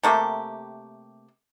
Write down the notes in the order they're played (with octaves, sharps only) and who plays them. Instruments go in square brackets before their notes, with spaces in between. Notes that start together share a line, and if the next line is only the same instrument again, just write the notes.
[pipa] C3 A3 A#3 G4